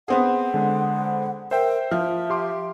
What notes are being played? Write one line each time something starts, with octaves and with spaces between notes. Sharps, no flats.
B3 C4 G#4 F#5
D3 G#3
A#4 C5 E5 G5
F3 E5 F6
G4 C6 D6